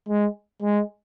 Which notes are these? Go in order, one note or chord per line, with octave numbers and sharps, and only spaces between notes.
G#3
G#3